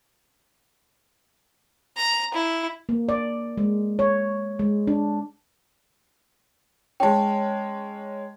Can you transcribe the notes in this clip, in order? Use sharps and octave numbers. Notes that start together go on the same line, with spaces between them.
A#5
E4
A#3
D5
G#3
C#5
G#3
D4
G#3 C#4 G5 A5